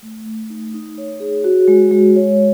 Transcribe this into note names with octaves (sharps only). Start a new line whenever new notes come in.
A3
A3
D#4
D#4
C#5
G#4
F#4
G#3
G#3
C#5